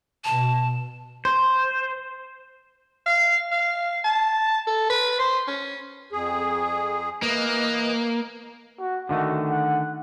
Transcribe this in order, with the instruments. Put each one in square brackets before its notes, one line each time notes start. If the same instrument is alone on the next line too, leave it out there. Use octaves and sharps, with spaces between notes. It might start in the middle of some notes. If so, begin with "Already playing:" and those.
[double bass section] B2 [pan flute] A5
[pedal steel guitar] C5
[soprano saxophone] F5
F5
A5
A4
B4
C5
C#4
[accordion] F2 G#4
[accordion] E3 B4 D#5 [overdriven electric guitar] A#3
[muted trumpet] F#4
[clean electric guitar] D3 D#3 A3 [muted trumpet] F#4
[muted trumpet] F#5